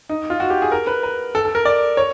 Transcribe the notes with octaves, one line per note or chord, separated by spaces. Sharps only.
D#4
F4
F#4
G4
G#4
A#4
B4
B4
A4
A4
A#4
D5
C#5